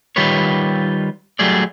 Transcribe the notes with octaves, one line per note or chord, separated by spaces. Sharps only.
D#3 G3 F4 G4 B4 C#5
F#3 G3 A3 G#4 D5